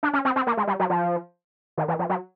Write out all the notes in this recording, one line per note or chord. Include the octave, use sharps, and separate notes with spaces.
D4
C#4
C4
C4
A#3
G#3
G3
F#3
F3
D#3
E3
F3
F#3